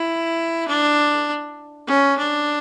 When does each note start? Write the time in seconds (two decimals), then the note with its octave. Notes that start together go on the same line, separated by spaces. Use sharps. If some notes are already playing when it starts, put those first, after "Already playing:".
Already playing: E4
0.68 D4
1.87 C#4
2.18 D4